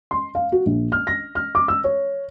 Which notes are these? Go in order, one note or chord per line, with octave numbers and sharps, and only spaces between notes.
C6
F5
F#4
A#1
F6
A#6
F6
D6
E6
C#5